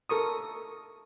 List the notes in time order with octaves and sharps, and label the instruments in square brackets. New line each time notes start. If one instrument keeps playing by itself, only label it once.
[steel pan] A4 A#4 C#6 D#6